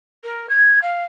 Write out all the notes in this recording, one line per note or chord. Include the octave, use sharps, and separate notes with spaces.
A#4
G#6
F5